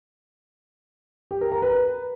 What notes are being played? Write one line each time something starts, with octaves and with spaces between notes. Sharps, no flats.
G4
A#4
A#5
B4